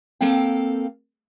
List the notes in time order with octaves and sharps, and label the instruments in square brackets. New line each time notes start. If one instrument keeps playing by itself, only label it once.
[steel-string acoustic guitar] A#3 C4 A4 F5 G5